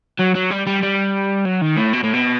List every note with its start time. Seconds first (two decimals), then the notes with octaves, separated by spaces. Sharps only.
0.19 F#3
0.35 F#3
0.51 G3
0.67 G3
0.82 G3
1.45 F#3
1.61 D#3
1.77 A2
1.93 B2
2.03 A2
2.13 B2